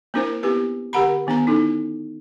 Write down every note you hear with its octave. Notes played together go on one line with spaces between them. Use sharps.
A#3 C4 D4 E4 A#4 C5
B3 C4 E4 G4 B4
D3 G4 A#4 F#5 A#5 B5
D#3 B3 D4 G#5 A#5
C#4 D#4 E4 A4